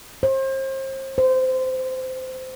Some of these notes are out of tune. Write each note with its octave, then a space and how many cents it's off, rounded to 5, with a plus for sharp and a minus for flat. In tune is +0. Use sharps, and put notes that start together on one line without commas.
C5 +35
C5 -20